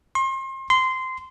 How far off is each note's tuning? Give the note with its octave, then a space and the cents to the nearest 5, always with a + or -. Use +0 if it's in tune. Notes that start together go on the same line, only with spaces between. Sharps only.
C6 +35
C6 -15